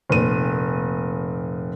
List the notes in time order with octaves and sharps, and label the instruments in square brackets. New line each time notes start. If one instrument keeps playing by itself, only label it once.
[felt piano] F1 A#2 D#7